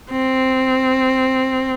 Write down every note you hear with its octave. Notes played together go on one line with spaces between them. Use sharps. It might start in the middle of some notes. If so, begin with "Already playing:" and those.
C4